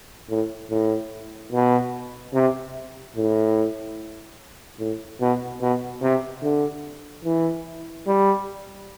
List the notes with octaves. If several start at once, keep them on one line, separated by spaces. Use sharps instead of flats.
A2
A2
B2
C3
A2
A2
B2
B2
C3
D3
E3
G3